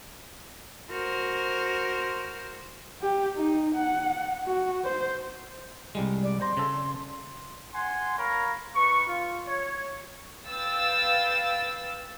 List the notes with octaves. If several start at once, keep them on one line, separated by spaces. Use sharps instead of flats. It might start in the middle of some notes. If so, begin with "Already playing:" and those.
F#4 A#4 C5
G4
D#4
F#5
F#4
C5
C2 G3 G#3
D5
C5 A#5 C6
C#3 A4
F#5 G#5 C6
A#4 C#5 F5 A#5 B5
D#4 B4 C#6
F4
C#5
B4 F5 G5 E6 A6